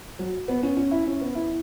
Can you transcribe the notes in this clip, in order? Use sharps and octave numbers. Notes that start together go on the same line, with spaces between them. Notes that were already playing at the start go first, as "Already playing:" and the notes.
F#3
B3
C#4
C#4
E4
C#4
B3
E4